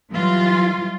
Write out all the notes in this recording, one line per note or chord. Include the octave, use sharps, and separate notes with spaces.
E3 F#3 G3 F4